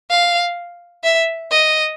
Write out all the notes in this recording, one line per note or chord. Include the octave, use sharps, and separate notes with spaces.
F5
E5
D#5